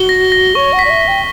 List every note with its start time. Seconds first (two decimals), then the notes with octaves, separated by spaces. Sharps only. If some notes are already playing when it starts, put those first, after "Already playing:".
Already playing: F#4 G7
0.09 A#6
0.32 A#6
0.55 C#5 C#6
0.73 F#5
0.79 B6
0.85 D5
0.90 E5
1.01 B6
1.08 G5